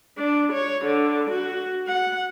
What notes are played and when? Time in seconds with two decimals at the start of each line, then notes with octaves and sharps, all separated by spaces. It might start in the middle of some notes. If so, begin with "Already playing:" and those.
0.18 D4
0.52 C#5
0.85 D3
1.30 F#4
1.87 F#5